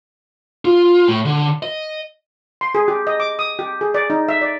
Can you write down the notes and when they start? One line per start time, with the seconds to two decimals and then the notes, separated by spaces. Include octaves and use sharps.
0.65 F4
1.08 A2
1.25 D3
1.63 D#5
2.61 C6
2.75 G#4
2.88 G4
3.07 D#5
3.20 D6
3.39 D#6
3.59 G4
3.81 G#4
3.94 D5
4.10 D#4
4.29 E5
4.42 D5